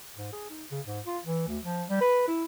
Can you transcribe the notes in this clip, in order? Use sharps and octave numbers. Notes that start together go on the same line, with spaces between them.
G#2
G#4
D#4
C#3
G#2
F4
E3
D2
F3
G3
B4
E4